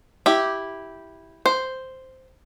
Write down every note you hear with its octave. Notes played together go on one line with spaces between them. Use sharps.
E4 G4
C5